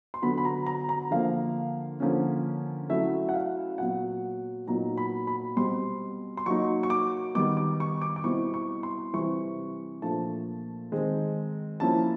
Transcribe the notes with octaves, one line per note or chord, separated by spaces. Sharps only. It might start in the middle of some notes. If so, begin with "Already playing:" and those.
C6
D3 F#3 B3 B5
B5
A#5
A#5
A#5
D3 F3 A#3 F5
D3 F3 A#3 C#4
F#3 A3 C#4 E4 E5
F#5
F5
A#2 F#3 B3 F#5
A#2 F#3 B3 D#4 A#5
B5
B5
B2 G3 C4 C6
C6
F#3 A#3 D#4 C#6
C#6
D6
D#3 G3 B3 D6
D6
C#6
D6
D6
B2 G3 C4 E4 C#6
C#6
C6
C3 E3 G3 C4 C#6
A#2 F3 A3 D4 A5
D#3 G#3 C4
F3 A#3 C#4 E4 A5